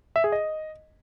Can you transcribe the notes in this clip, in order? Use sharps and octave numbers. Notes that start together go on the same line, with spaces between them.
E5
G#4
D#5